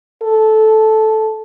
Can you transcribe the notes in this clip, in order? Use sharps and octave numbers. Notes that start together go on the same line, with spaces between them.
A4